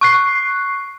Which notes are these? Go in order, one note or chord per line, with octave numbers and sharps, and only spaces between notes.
C#6 F#6 C7